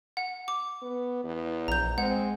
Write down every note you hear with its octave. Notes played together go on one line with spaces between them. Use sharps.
F#5
D6
B3
E2
A#1 A#5 G6
G#3 C4 F#5